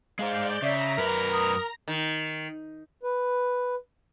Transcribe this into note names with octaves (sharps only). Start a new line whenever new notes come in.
G#3 G#4 C5 D5 F5 G6
C#3 E5 A#5
F#2 A#4 B4
D#6
D#3
B4